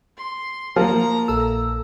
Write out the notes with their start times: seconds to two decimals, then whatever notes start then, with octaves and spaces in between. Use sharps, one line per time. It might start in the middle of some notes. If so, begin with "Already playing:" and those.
0.17 C6
0.76 F3 A#3 A#5
1.28 A#1 A4 E6